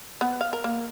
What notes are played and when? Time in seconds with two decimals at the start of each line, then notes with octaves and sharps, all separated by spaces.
0.21 B3
0.41 F5
0.53 A#4
0.64 A#3